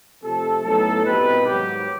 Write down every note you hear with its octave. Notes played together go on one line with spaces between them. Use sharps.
F2 C3 F3 A3 A4
A2 F#3 B3 D#4 A4
C2 B2 G3 C4 D#4 B4
G#2 D#3 F#3 G4